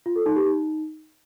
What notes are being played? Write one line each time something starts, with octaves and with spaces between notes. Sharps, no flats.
F4
A4
D#4
G4
D#4